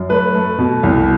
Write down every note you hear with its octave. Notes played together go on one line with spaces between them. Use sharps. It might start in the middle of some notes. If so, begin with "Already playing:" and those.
Already playing: F#2
A3 B4
A3
B2
C2